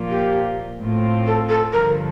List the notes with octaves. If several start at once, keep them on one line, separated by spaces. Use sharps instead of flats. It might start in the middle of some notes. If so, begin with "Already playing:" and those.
Already playing: A#2 F3 A#3 F4
G4
A2 A3 C4 F4
A4
A4
G2 D3 F3 A#4